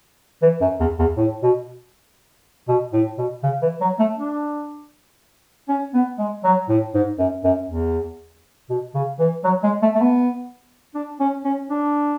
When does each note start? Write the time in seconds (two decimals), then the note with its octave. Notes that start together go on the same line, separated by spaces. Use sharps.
0.42 E3
0.61 F#2
0.80 E2
0.99 E2
1.17 A2
1.43 B2
2.68 B2
2.93 A2
3.18 B2
3.43 C#3
3.62 E3
3.81 F#3
3.99 A3
4.18 D4
5.69 C#4
5.94 B3
6.19 G#3
6.44 F#3
6.69 A2
6.94 G#2
7.19 F#2
7.44 F#2
7.69 E2
8.69 B2
8.94 C#3
9.19 E3
9.44 F#3
9.63 G#3
9.82 A3
9.95 A3
10.01 B3
10.95 D4
11.20 C#4
11.45 C#4
11.70 D4